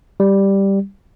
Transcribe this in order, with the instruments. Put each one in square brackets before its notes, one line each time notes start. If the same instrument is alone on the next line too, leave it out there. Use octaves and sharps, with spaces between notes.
[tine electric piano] G3